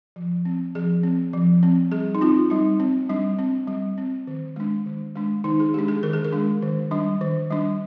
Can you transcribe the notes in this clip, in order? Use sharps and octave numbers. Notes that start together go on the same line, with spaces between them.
F3
C4
F3 G#4
C4
F3
C4
G3 G#4
D#4
C4 F4
G3 D#4
C4
G3 D4
C4
G3
C4
D#3
G#3 D4
D#3
G#3 D4
D#3 D#4
G#4
G#3 D4 G4
G#4
D#3 A#4
G#4
A#4
G#3 D4
D#3
G3 D4
D#3
G3 D4